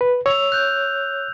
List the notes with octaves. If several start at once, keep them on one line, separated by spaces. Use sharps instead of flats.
B4
C#5 E6 F7
F#6 G6